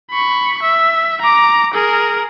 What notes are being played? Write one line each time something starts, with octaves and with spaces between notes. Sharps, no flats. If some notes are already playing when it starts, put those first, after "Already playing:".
B5 C#6
E5
A#5 D6
G#4 A#4